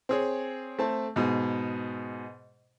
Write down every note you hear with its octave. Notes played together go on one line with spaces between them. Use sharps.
C4 G#4 C#5
A3 C4 A5
G#2 B2